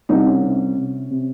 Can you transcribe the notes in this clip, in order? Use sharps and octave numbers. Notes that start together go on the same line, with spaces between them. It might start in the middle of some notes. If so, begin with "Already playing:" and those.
C2 D#4
C#4
C3
C3
C3